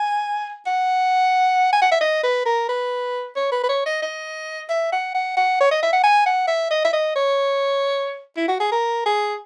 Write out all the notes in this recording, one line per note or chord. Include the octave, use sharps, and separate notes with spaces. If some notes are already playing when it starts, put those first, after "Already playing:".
Already playing: G#5
F#5
G#5
F#5
E5
D#5
B4
A#4
B4
C#5
B4
B4
C#5
D#5
D#5
E5
F#5
F#5
F#5
C#5
D#5
E5
F#5
G#5
F#5
E5
D#5
E5
D#5
C#5
E4
F#4
G#4
A#4
G#4